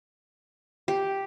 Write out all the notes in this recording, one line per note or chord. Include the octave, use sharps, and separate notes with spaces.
G4